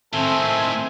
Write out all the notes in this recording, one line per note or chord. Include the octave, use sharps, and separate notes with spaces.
A2 D#3 C4 A4 E5 G#5